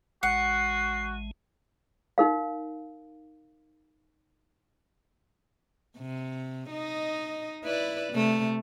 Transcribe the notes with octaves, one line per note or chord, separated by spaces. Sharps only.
A1 G#3 F#4 F#5 C7
D#4 A#4 F5
C3
D#4 D#5
E4 B4 D5
C3 A3